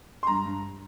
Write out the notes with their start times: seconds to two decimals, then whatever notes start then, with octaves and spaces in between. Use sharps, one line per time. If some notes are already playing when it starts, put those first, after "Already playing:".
0.23 C6
0.27 G2 A#5
0.46 G2